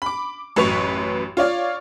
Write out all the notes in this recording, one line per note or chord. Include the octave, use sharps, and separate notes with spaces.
B5 D6
A1 F#2 B4 C#6 F7
F4 C#5 D5 F5